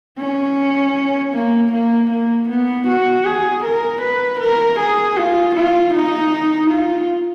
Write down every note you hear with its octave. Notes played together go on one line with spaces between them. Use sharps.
C#4
A#3
A#3
A#3
B3
F#4
G#4
A#4
B4
A#4
G#4
F4
F4
D#4
F4